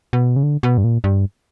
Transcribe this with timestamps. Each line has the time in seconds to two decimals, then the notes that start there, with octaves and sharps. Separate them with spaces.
0.13 B2
0.36 C#3
0.43 D3
0.63 B2
0.78 G2
0.84 A#2
1.04 G2